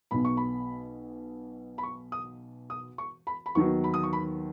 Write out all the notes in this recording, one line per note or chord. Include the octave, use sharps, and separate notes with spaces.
B1 B2 B3 B5
C#6
B5
B5
C#6
D#6
D#6
C#6
B5
B5
D#2 D#3 F#3 B3 C#6
B5
D#6
C#6
B5